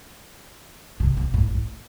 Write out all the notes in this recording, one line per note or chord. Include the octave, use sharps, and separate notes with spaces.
C3
B2
A2
A2